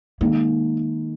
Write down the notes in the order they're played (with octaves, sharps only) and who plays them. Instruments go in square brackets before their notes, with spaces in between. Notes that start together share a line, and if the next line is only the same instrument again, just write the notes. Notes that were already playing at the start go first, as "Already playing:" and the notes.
[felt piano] D#3 G#3 D#4 [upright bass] A#3